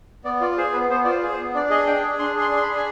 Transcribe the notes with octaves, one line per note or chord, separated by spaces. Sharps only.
B3 D5
F4 D5
G#4 C5
B3 B4
B3 C5
F4 D5
C5
G#4
C5
B3
D4 D5
G#4 D#5
D4 G5
G#4
D4 C6
G#4
C6
D4
C6
B5
G#4
G#5